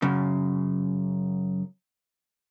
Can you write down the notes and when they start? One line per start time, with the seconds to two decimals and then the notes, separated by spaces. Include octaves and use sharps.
0.02 F#2 C#3